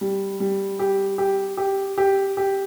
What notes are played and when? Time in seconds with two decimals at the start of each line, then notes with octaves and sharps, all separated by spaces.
0.01 G3
0.40 G3
0.79 G4
1.18 G4
1.57 G4
1.98 G4
2.37 G4